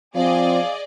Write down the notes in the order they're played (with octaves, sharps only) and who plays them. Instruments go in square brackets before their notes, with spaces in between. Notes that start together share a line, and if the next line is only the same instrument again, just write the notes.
[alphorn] F3 [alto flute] C4 [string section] G#4 D5 D#5 [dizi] F5